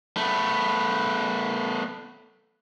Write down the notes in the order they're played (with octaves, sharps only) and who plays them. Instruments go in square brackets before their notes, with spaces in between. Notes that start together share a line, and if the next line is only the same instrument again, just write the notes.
[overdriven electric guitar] A3 B3